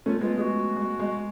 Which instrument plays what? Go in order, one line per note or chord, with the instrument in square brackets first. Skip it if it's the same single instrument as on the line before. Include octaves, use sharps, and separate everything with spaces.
[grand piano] A3 C#4 [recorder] F4
[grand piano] G#3 B3 [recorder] F4
[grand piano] G#3 [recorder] G#4
[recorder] F#4
[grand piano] G#3
G#3